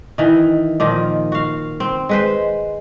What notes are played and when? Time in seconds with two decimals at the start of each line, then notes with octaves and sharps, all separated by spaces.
0.18 D#3 E3
0.80 A#2 D#3 F3
1.32 F#4 F5
1.80 C4
2.09 G#3 B4 C5